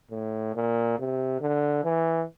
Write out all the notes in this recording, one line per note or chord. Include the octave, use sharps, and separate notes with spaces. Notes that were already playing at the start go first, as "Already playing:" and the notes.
A2
A#2
C3
D3
E3